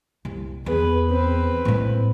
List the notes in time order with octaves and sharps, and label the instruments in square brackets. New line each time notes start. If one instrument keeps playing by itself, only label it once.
[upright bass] C2
[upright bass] E2 [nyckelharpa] G#4 B4
[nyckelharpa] C4 B4
[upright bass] A2 G#3